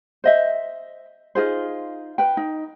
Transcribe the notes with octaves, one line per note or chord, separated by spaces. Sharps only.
C5 D#5 E5
D#4 F4 G#4 C5
B4 G5
D#4